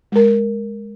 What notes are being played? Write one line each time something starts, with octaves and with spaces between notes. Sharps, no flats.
G#3 A#4